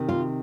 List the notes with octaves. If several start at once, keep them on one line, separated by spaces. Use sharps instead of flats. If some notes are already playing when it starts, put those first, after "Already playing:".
Already playing: C3 D#3
F4